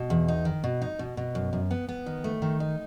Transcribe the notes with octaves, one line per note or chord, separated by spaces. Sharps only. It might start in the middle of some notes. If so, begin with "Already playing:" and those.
Already playing: B2
E2
D#4
D#3
B2
D#4
B2
B2
F#2
F#2
B3
B3
D#3
A3
D#3
D#4